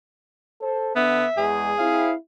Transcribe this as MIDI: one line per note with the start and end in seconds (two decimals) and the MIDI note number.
0.61 0.91 69
0.61 0.91 72
0.96 1.22 50
0.96 1.26 59
0.96 1.46 76
1.37 1.73 40
1.37 1.73 56
1.37 2.10 68
1.78 2.14 60
1.78 2.14 64
1.78 2.13 77